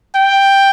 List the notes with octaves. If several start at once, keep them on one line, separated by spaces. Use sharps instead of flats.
G5